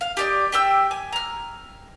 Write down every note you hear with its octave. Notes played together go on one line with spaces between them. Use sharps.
F5
G4 D5 D#5
G4 G5 E6
G#5
A#5 F6